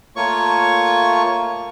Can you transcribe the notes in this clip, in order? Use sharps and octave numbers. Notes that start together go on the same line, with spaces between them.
A3 A#3 F4 C#5 C#6